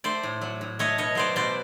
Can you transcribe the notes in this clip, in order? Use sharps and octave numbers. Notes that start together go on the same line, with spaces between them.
A3 C5 D5
A2
F#3
A2
A3 C#5 D#5
B2 C#5 D#5
F#3 C5 D5
B2 C5 D5